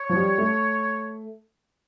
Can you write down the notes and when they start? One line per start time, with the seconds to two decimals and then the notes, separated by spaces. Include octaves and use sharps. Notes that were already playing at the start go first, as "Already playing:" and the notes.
Already playing: C#5
0.09 F3
0.16 G3
0.38 A3